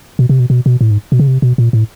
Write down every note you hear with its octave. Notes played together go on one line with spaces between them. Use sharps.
B2
C3
B2
B2
B2
A2
G#2
B2
C#3
C3
B2
A#2
A2